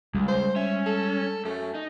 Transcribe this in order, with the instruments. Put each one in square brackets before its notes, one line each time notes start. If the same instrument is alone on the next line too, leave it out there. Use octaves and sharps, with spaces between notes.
[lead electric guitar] C#2 [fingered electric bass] G3 G#3
[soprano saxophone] C5
[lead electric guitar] C#4 [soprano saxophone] E5
[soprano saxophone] A4
[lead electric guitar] F#2 [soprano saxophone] A3
[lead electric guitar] D#4